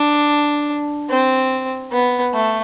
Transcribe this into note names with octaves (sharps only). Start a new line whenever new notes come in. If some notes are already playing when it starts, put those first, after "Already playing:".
Already playing: D4
C4
B3
A3